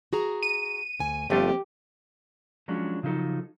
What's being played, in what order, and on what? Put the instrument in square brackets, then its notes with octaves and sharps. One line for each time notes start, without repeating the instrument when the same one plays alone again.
[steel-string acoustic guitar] F#4 G#4 A#5
[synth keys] D#7
[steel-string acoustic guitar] D2 G#5
[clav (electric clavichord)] G1 A3 F4 [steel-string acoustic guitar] F3 A#3 C4 [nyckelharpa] G4
[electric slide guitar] F3 F#3 G#3 C#4 D4
C#3 F3 F#3 D#4 A4